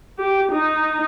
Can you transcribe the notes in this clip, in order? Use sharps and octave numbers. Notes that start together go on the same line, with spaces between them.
G4
D#4